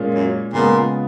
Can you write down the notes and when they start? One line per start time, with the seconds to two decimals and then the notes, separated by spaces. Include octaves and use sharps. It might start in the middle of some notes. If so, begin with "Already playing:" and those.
Already playing: A#2 G#3 C#4 F4
0.14 F#2
0.53 A#2 C#3 G#3 B3 F4